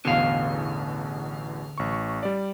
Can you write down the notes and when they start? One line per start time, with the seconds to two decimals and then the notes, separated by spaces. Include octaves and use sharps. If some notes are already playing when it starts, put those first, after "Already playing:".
0.05 A1 E2 B2 D3 F5
1.78 A1 C#6
2.23 G3 D5